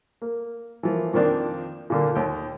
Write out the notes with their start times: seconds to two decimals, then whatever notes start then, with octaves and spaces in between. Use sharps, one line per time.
0.22 A#3
0.83 E3 F3 A#3
1.13 F2 D#3 F3 A#3 C4 D4
1.90 A#2 D3 A#3
2.15 D#2 G5